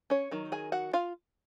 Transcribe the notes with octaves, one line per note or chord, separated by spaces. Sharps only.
C#4 C#5
D#3 F#3
G#4 G#5
F#4 F#5
F4 F5